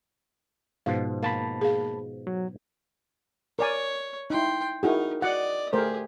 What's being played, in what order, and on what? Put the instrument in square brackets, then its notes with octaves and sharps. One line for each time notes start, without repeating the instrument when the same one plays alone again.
[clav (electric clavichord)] G#2 B2 F3 [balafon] F5
[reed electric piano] A#3 A5 B5 [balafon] F5
[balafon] G#4 F5
[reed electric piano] F#3
[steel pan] A#4 D5 G#5 [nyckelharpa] C#5
[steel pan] D#4 E4 [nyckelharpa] G5 C6
[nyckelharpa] D#4 A#4 [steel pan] E4 F#4 G#4
[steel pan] F#4 F#5 [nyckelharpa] D5 D#5
[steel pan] A3 A#4 C5 [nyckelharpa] G4 G#4